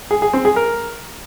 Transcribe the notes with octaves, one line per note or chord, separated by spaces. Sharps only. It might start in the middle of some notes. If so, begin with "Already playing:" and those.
G#4
G#4
C4
G#4
A#4